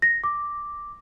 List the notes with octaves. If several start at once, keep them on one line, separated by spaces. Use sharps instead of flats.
A#6
D6